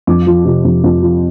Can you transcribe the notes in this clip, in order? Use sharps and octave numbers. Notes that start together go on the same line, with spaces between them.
F2 D6
F3
C3
F2
F2
F3